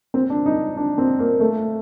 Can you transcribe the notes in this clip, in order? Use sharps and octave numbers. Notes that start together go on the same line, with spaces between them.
C4
D4
D#4
D4
C4
A#3
A3